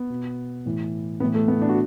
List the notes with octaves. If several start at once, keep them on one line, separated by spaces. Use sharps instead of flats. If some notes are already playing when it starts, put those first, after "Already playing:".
Already playing: B3
B2
A2 E3
A2 E3 B3
A3
B3
D4
F#4